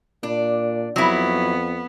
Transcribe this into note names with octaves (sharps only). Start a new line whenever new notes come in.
A#2 D4
F2 F#3 B3 E4